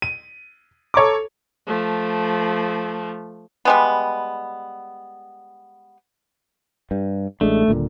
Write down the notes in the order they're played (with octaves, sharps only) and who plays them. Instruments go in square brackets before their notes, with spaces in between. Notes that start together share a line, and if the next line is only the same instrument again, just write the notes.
[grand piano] D#7
A4 C#5 A#5 D6
[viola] F3 A3
[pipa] G3 G#3 B3
[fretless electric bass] G2 G3
[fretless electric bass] A1 G#3 D4 [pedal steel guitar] A3
[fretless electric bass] D#1 A#2 D3